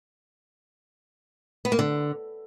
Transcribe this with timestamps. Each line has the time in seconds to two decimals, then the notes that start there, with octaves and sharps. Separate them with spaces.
1.65 B3
1.72 A#3
1.79 D3